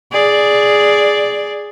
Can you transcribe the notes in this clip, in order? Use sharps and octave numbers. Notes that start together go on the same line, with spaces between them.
G#4 D5